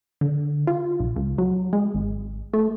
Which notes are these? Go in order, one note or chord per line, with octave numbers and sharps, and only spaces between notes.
D3
F4
B1
C#2
F#3
G#3
G#1
A3